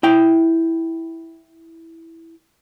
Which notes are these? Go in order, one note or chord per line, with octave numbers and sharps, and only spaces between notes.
E4 G5